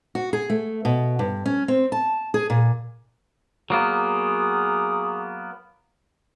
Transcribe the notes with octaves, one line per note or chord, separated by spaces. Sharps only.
F#4
G#4
A3
B2
G2
C#4
C4
A5
G#4
A#2
F#3 A#3 B3 G#4